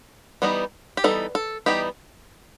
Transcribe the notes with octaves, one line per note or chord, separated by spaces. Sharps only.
E3 G3 B3 D#4
G4
E3 G3 B3 D#4 A4
A4
E3 G3 B3 D#4 G4